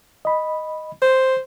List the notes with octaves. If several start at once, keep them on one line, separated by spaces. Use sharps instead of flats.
D#5 B5
C5 C6